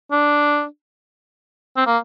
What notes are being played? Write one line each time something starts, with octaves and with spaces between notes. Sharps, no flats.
D4
C4
A#3